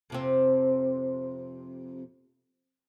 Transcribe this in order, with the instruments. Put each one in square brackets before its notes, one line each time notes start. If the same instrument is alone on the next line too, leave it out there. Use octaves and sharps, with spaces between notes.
[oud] F2 C3 C4